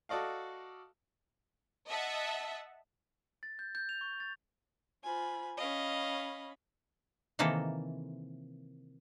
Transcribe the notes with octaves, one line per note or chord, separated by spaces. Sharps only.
F#4 A4 D5 D#5 F5
D#5 E5 F#5 A5
A6
G6
G6
F7
C#6
A6
F4 C5 G#5 B5
C#4 D#5 F5 B5
C3 D#3 E3 A#3 A4